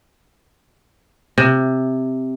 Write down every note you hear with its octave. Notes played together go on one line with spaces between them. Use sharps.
C3